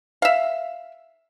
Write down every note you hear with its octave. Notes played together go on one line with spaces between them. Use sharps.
E5 F5